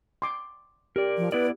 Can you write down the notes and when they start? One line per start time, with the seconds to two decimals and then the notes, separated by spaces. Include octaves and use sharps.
0.22 C6 D6
0.96 G4 A#4 D5
1.17 F3
1.32 B3 E4 B4 D5